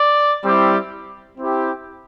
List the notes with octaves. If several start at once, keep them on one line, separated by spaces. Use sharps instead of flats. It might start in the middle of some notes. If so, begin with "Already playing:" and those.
Already playing: D5
G3 C4 E4 G4
C4 E4 G4